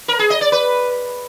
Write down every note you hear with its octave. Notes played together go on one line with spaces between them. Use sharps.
A#4
G#4
D#5
D5
B4